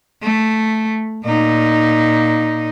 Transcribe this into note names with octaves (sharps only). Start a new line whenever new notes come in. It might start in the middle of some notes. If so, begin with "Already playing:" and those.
A3
A#2 D#4